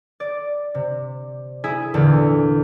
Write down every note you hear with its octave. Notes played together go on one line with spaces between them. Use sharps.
D5
C3
E4 G#4 E5 G#5
E2 A#2 D3